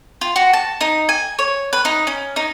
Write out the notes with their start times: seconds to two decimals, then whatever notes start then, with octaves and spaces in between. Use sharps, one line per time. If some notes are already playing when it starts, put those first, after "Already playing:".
0.21 F4
0.36 F#4
0.53 A5
0.81 D#4
1.09 G#5
1.39 C#5
1.73 B4
1.85 D#4
2.07 C#4
2.36 D#4